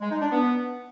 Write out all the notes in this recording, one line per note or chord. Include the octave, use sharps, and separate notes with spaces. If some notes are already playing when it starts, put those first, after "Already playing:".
G#3
D#4
D4
B3